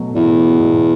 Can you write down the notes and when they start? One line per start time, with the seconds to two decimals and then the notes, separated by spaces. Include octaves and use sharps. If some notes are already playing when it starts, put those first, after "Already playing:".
Already playing: B2 F#3 A3
0.14 E2 B2
0.38 F#3
0.60 B2